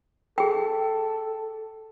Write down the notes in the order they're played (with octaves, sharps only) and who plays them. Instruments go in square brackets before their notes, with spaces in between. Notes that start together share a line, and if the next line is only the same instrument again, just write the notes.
[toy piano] G#4 G5 [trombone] A4